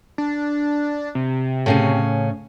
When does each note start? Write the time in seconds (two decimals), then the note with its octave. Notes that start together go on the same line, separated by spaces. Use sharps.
0.18 D4
1.15 C3
1.66 A2 C#3 C#4